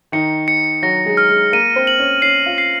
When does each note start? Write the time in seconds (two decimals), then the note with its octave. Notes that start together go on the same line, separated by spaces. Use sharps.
0.12 D#3 D#4 C#7
0.48 C#7
0.82 F#3 F#4 A#6
1.06 G#3 G#4
1.17 F6
1.29 G#3 G#4
1.53 A#3 A#4 D#7
1.76 C4 C5
1.87 F#7
1.99 C#4 C#5
2.22 C#4 C#5 C7
2.46 F4 F5
2.58 C7